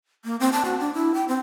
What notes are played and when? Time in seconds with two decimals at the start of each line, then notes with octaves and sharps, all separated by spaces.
0.25 A#3
0.40 C4
0.52 A5
0.65 F#4
0.80 D4
0.94 E4
1.14 G5
1.28 C4